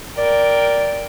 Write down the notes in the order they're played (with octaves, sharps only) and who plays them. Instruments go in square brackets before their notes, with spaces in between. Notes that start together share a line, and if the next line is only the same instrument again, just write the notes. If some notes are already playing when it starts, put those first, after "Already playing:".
[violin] A#4 G5 [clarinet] D5